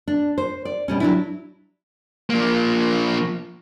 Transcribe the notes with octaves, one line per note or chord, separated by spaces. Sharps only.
D4
C5
D5
B2 G3 C#4
F#3 D4 E4
F3 A#3